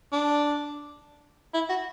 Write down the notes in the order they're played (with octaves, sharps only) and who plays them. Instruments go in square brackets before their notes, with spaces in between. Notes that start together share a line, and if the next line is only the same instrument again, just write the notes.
[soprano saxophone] D4
E4
F#4